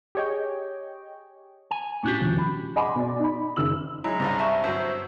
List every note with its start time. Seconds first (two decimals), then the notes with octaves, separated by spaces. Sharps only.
0.15 G4 G#4 C#5 D#5 G5
1.71 G#5
2.04 A2 C#4 D4 F#4 G4
2.20 D#1 F3 F#4
2.38 B5
2.76 D#5 F#5 G#5 B5 C6 D6
2.96 B2 D5
3.20 D#4 B5
3.56 F#1 D#3 E6 F#7
4.04 F#3 G#3 D#4 E4 A#5
4.20 C2 G2 C3 G3
4.39 E5 A5 C#6
4.64 G1 F#3 C5 E6